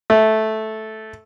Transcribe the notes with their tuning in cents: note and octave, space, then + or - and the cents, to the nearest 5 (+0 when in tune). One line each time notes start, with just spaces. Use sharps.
A3 -10